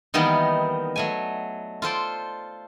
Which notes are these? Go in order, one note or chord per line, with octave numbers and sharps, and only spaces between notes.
D#3 E3 G3 A#3 B3 D#4
F#3 A3 G#5
F4 A4 C5 D5